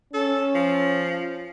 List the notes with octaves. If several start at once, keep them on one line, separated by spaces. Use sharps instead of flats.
C#4 A4
F3